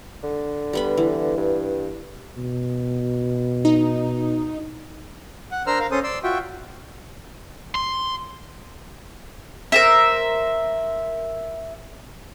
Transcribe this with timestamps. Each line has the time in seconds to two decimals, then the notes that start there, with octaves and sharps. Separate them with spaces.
0.24 D3
0.73 G3 B3 B5
0.97 E3
1.37 G2
2.37 B2
3.65 D#4
5.51 F#5
5.67 D4 A#4 C5 A#5 E6 F6
5.80 A#4 F5
5.91 C#4 A4 C5 D#6
6.04 D5 C6 E6
6.24 F4 F#4 E5 G5
7.75 C6
9.72 A#4 C5 E5